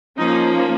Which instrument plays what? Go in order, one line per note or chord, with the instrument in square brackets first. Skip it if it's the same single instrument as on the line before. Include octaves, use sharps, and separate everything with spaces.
[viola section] F3 A#3 C#4 D#4